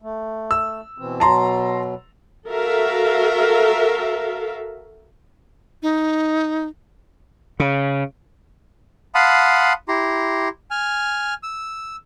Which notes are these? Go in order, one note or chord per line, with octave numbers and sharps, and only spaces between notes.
A3
E6
B2 E3 C4
B2 F#3 A5 A#5 C6
F#4 A4 A#4 E5 F5
D#4
C#3
F5 F#5 A5 B5 C6 D#6
E4 G4 A#5 C6
G#5 F6
E6